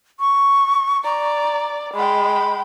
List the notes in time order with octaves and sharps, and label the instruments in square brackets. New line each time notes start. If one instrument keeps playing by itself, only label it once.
[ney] C#6
[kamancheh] D5 [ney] A#5
[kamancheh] G#3 G5 [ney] B5